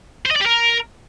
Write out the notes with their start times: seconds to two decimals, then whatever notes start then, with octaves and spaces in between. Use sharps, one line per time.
0.26 C5
0.31 D#5
0.36 D5
0.41 G4
0.46 A#4